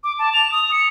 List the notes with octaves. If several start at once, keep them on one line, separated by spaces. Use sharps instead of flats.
D6
A5
F7
D#6
C#7